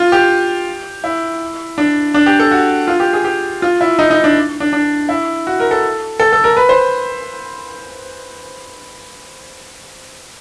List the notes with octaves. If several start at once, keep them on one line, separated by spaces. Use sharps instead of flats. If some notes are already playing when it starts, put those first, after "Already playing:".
Already playing: F4
G4
E4
D4
D4
G4
A4
F#4
F4
G4
G#4
G4
F4
E4
D#4
D#4
D4
D4
D4
E4
F#4
A#4
A4
A4
A4
A#4
B4
C5